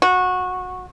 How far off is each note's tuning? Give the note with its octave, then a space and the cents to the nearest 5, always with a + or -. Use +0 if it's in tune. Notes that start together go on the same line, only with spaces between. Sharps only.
F#4 -20